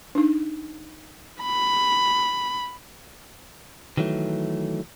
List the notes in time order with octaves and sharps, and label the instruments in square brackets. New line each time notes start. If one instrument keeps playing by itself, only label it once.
[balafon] D4 D#4
[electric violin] B5
[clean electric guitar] D#3 E3 F#3 A3